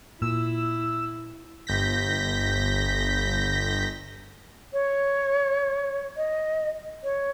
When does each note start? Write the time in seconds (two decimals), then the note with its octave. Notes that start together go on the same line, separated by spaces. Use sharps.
0.22 A#2 E4 E6
1.67 G1 G6 A#6 B6
4.73 C#5
6.17 D#5
7.04 C#5